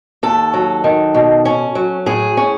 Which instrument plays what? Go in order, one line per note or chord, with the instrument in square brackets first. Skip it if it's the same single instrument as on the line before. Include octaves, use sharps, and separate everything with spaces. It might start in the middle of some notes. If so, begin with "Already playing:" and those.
[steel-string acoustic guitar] D#2 A4
F#3
D#3
B2
C#4
F#3
A2 G#4
C#4